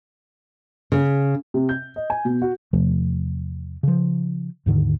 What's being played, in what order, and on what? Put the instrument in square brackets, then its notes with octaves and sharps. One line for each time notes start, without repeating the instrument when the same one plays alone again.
[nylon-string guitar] C#3
[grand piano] C3
G6
D#5
G#5
B2
F#4
[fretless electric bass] E2 C3 F3 A3
C#3 F3
D#2 G#2 D3 D#3